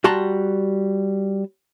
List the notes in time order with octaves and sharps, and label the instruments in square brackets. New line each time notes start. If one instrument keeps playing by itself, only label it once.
[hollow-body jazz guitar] G3 F#4 A5 A#5 C6